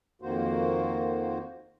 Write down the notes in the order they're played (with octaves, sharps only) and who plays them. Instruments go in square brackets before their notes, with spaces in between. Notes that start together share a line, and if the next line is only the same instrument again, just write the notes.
[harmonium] F2 D#3 A#3 F#4 C5